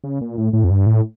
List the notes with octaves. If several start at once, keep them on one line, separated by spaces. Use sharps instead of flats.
C#3
A#2
A2
A2
F2
G2
A2